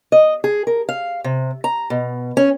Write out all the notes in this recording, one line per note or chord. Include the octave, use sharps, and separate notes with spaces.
D#5
G#4
A#4
F5
C3
A#5
B2
C#4